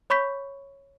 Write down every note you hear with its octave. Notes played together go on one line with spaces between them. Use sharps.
C#5 B5 C#6 G6 B6